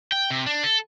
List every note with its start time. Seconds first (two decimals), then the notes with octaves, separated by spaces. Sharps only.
0.12 G5
0.30 C3
0.46 D4
0.64 A4